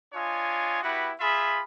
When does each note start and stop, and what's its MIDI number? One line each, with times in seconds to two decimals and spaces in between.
0.14 0.82 62
0.14 0.82 65
0.14 0.82 73
0.14 0.82 75
0.14 0.82 80
0.83 1.12 59
0.83 1.12 64
0.83 1.12 66
0.83 1.12 67
0.83 1.12 71
1.20 1.62 65
1.20 1.62 68
1.20 1.62 76
1.20 1.62 83